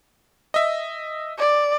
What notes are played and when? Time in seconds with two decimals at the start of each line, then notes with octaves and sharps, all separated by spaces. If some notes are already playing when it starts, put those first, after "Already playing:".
0.54 D#5 E5
1.39 D5